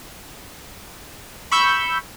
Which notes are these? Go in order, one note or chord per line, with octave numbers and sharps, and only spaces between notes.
B5 C#6 E6 G6